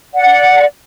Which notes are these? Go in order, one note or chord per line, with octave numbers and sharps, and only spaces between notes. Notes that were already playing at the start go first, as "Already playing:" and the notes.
D5 F#5